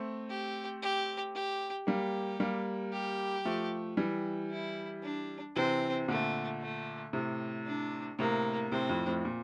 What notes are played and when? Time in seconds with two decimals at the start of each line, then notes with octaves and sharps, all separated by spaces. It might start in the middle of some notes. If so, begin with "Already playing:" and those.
Already playing: A3 C4
0.29 G4
0.82 G4
1.35 G4
1.87 G3 A#3 G4
2.40 G3 A#3
2.92 G4
3.45 F3 A3
3.97 E3 G3
4.51 E4
5.03 D4
5.56 C3 E3 C4
6.08 A#2 D3 A3
6.61 A3
7.13 A2 C3
7.66 D4
8.18 A2 C3 A#3
8.72 A2 C3 C4
8.89 F2 A2
9.07 F2 A2
9.25 A#2